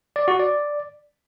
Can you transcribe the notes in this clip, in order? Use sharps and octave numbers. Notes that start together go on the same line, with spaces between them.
D5
F#4
D5